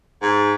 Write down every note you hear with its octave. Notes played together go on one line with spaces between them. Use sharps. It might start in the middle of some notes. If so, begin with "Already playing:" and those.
G#2